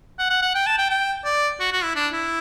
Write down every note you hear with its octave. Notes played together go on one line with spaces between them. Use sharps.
F#5
F#5
F#5
G5
A5
G5
G5
D5
F#4
F#4
E4
D4
E4